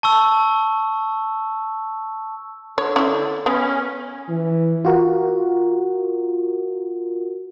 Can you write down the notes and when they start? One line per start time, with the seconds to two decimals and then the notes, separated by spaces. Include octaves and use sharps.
0.03 A5 C#6 E6
2.78 D3 C#5
2.96 C#4 E4
3.46 B3 C#4
4.29 E3
4.85 F4 F#4 A#4